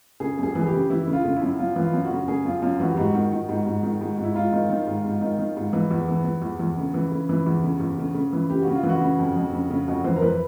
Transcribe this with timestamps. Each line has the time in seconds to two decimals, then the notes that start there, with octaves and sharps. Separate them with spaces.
0.20 C#3 G#4
0.38 F#2 G#4
0.55 E3
0.61 G#4
0.67 G4
0.73 C#3
0.90 E3 E4
1.07 C#3
1.13 F4
1.24 C#3
1.36 E4
1.42 F#2
1.59 F#2 F4
1.76 E3
1.82 F4
1.93 F#2
2.05 F#4
2.10 C#3
2.27 C#3 G#4
2.45 F#2 F4
2.62 F#2 F4
2.80 E3 F#4
2.90 G4
2.96 G#2 F#4
3.14 D#3
3.32 D#3
3.49 G#2
3.66 G#2
3.83 D#3
4.01 G#2
4.18 G#2
4.24 E4
4.35 G#2 F4
4.52 D#3
4.70 D#3
4.87 G#2
5.05 G#2
5.21 D#3
5.39 D#3
5.56 G#2
5.73 E3
5.91 E2
6.08 E3
6.25 E3
6.42 E2
6.59 E2
6.77 C#3
6.94 E3
7.11 C#3
7.29 E3
7.46 E2
7.63 C#3
7.80 E2
7.98 C#3
8.14 C#3
8.33 E3
8.50 C#3 G4
8.62 F#4
8.67 C#3
8.75 F4
8.83 E3
8.89 F#4
9.01 C#3
9.18 F2
9.36 F2
9.53 C#3
9.70 C#3
9.87 F2 F#4
10.04 E3 C5
10.16 A#4
10.22 E3 B4